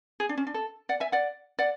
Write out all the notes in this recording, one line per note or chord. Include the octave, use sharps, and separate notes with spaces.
G#4
D4
C#4
D4
A4
D5 F#5
E5 G#5
D5 F#5
D5 F#5